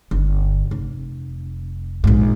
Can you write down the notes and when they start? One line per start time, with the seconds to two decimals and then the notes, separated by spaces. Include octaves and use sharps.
0.11 G1
0.71 F1
2.04 A#1 G#2